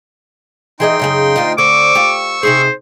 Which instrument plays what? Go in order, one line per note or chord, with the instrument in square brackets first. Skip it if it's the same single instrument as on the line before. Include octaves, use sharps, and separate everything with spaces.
[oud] E3 G#4 D#5 [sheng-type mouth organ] D#4 G5 C6
[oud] F#2 C#3 G#4
D2 F4 D#5
[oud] D3 C4 [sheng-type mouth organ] C#6 E6 [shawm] D6
[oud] F4 G4
[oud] C3 D#4 G#4 [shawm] C5